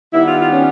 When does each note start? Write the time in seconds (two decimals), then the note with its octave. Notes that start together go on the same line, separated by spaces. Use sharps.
0.13 D#3 G3 B3 E4
0.25 F4
0.39 F4
0.52 C#4